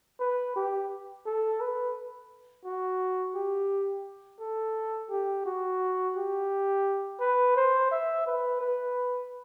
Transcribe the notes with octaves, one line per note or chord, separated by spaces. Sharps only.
B4
G4
A4
B4
F#4
G4
A4
G4
F#4
G4
B4
C5
E5
B4
B4